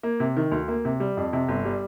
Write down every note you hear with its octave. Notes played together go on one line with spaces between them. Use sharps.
A#3
C3
D#3
D2
A#3
C3
G3
F2
C3
G1
G3